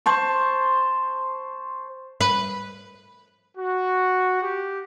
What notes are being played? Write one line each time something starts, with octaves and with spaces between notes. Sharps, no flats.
C5 A5 C#6
B4
F#4
G4